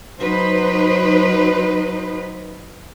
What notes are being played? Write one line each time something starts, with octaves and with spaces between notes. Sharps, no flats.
F#3 D#4 B4 C5